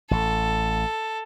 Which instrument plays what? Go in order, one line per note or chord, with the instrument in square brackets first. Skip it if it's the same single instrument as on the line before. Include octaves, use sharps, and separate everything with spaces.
[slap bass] A1 [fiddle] A4